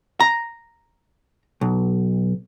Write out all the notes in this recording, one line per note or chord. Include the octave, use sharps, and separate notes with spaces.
A#5
B1